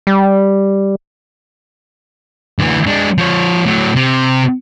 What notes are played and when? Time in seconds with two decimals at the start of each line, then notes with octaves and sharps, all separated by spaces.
0.07 G3
2.59 D2 E3
2.87 G#3 D4
3.18 F3 C#5
3.66 A2 F#3
3.96 C3